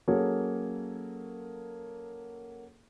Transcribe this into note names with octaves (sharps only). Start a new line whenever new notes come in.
F#3 A#3 C#4 G#4 A4 C#5